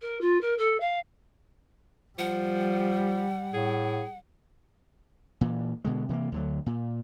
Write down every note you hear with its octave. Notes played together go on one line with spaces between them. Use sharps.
A#4
F4
A#4
A4
F5
F3 G3 F#5
A2 G#4
A#2 E3
B2 D3 G#3
C3 E3 G#3 A#3
D2 D3 F#3
A#2